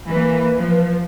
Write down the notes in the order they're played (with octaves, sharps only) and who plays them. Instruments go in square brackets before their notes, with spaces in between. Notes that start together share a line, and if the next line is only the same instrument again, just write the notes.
[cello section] E3 A#3 [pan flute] B4
[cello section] F3